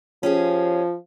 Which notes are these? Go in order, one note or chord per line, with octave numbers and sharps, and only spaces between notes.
F3 C#4 G4 G#4